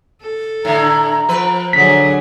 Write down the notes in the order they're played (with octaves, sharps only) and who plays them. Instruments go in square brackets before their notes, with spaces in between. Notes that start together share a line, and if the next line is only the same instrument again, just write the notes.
[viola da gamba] A4
[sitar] A2 D3 [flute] A#5
[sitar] F3 B4
[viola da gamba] D3 F#3 G#4 [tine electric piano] B6